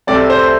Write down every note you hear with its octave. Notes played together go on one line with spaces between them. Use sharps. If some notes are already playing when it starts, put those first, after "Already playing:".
C2 C3 A3 C4 D5
C5